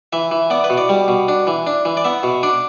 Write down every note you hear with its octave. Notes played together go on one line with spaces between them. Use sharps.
E3 E5
E3
B3 D5
B4
B2
D5
G3
B2
D4
E3
D4
E3
D5
B3 E5
B2
D4 D5